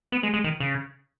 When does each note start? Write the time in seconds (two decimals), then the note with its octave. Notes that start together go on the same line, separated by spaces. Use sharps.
0.12 B3
0.23 G#3
0.34 G#3
0.44 D#3
0.60 C#3